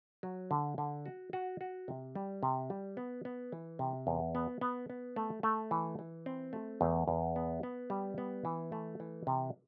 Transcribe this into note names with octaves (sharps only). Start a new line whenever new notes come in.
F#3
D3
D3
F#4
F#4
F#4
C3
G3
C3
G3
B3
B3
E3
C3
E2
B3
B3
B3
A3
A3
E3
E3
C4
A3
E2
E2
B3
B3
G3
B3
E3
A3
E3
C3